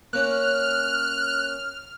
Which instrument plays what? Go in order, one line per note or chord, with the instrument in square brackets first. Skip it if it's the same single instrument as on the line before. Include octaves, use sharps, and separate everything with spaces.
[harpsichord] A#3 C#4 [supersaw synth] F6 [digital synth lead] F#6